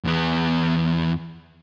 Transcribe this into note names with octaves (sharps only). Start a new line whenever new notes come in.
E2 B3